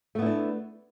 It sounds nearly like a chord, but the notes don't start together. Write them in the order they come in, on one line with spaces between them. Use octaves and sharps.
A3 B3 E4 D4